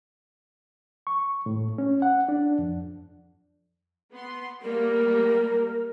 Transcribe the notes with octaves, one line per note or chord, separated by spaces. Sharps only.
C#6
A2
C#4
F#5
D4
F2
B3 C6
G3 A3 A#3 A#4